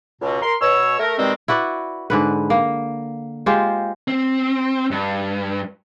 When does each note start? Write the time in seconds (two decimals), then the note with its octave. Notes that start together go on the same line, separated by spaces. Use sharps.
0.21 C#2 B2
0.42 A#4 C6
0.61 B2 C#5 E6
0.99 A3 A#4
1.18 B2 D#3 G3 G#3 C4
1.48 E4 F#4 B4 D5
2.10 G#2 D3 B4
2.50 A#3
3.46 G#3 F4 G4 C5
4.08 C4
4.91 G2